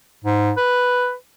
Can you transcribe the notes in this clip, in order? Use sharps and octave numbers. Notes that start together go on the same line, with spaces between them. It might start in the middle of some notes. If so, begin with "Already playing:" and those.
G#2
B4